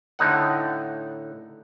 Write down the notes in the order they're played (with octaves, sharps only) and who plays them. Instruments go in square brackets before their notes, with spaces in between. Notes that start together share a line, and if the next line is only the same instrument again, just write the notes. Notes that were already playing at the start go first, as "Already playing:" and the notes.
[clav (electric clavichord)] A2 D3 D#4 F#5